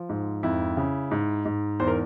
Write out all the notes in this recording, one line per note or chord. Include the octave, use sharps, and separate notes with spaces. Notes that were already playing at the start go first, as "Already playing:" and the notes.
Already playing: F3
G#2
F2 E4
C#3
G#2
G#2
E2 C5
A#4